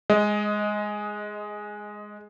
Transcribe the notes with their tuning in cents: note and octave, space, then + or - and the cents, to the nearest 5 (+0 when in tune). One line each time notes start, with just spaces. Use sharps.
G#3 +0 D#5 +20